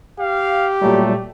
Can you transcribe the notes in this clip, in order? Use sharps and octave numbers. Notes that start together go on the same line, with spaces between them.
G4 F5
A#2 F#3 G3 A3